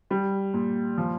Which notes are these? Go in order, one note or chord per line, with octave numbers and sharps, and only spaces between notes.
G3
A#2
F3